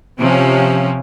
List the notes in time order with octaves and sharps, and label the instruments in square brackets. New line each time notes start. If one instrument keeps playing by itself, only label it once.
[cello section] C3 F3 C#4